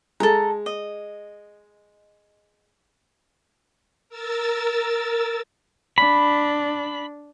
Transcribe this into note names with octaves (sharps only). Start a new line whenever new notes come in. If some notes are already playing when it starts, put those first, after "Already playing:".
G#3 A4 A#5
D#5
A#4 E6 A6
D4 B5